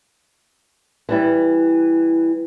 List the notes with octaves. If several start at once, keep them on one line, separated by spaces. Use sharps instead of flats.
E3 G3 E4